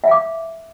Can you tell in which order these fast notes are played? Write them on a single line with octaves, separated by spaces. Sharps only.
E5 F5 D6